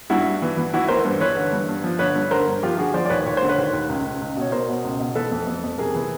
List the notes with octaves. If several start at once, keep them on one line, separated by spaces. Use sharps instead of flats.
G2 E4 F#4
G2
E3
E3
E3 E4 F#4
E3 A#4 C5
G2
E3 B4 C#5
D3
G2
G2
F3
D3 B4 C#5
G2
D3 A#4 C5
G2
F3 F4 G4
D3 F#4 G#4
F3 C5 D5
D5
D#2 B4 C#5
D#2 C#5
C5
D3
B4 C#5
D#2
D#2
C#2
C#2
C#2
B2 C#5
B2 A#4 C5
B2
C#2
B2
E3 A4 B4
F2
F2
F2
C3 G#4 A#4
E3